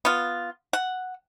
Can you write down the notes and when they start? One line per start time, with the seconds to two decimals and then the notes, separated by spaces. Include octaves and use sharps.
0.05 B3 F4
0.73 F#5